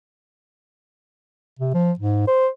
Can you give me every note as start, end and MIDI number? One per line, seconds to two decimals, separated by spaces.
1.59 1.73 48
1.74 1.92 53
1.99 2.25 44
2.27 2.48 72